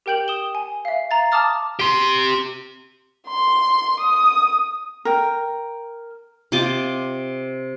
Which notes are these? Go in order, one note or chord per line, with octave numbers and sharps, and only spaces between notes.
G4 A#4 G5 G6 F#7
D#6 E7 G7
G#5
E5 F5
F5 A#5 A6
A5 A#5 D6 D#6 F6 A6
G4 C6
C6
D#6
A#4 G5
C3 F4 D#5 D6